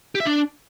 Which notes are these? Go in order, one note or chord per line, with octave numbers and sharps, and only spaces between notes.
G4
E5
D4